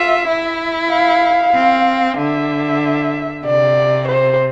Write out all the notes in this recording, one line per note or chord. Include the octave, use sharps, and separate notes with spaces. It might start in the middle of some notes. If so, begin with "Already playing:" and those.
Already playing: F4 E5
E4
F5
C4
D3 E5
C3 D5
C5